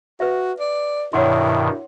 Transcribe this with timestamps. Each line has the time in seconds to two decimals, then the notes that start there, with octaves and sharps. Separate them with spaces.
0.20 F#4 B4 E5
0.59 D5
1.13 G2 B2 D#3 E4 C#5 F#5 C6